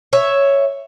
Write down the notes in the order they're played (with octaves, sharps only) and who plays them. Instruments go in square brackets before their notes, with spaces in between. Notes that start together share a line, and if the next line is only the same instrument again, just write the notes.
[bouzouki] C#5 E5